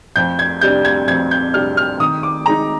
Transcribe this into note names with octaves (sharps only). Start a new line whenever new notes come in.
F2 G6
G#6
C3 G3 D4 G6
G#6
F2 G#6
G6
C3 G3 D4 F6
F6
D#3 D#6
D6
G#3 D#4 A#5